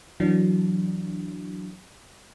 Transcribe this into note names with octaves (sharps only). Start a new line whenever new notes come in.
E3 F#3 D4